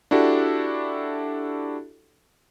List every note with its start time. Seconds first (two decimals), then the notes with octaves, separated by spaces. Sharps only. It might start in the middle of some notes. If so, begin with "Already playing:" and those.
0.11 D4 E4 F#4 G4 A4